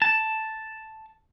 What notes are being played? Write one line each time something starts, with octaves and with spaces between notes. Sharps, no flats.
A5